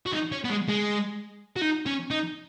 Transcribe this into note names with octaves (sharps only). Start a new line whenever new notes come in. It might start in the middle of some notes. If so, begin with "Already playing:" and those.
F#4
D#4
C#4
B3
G#3
G#3
F#4
D#4
C#4
D#4